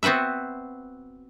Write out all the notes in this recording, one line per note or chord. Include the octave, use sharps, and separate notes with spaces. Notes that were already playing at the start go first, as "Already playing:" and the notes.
B3 C4 F#4 B4 E5